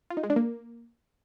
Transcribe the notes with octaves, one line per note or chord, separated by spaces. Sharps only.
F4
D#4
G#3
D4
A#3